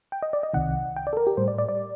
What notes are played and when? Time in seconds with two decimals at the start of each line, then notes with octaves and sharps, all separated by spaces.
0.12 G5
0.23 D#5
0.33 D5
0.43 D#5
0.54 C2 C3 D#3 F#5
0.96 G5
1.07 D5
1.13 A4
1.17 A#4
1.27 G4
1.37 A2 G3 C5
1.48 D5
1.58 D5
1.69 D5